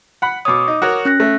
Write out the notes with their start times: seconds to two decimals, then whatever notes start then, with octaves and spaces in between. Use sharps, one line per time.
0.22 F#5 B5
0.45 B2 C#5 D6 D#6
0.68 D#4
0.82 F#4 A#4 C#5
1.05 C#4 F#6 A#6
1.20 A3